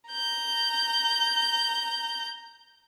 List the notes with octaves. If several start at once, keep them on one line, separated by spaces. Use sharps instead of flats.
A#5 G6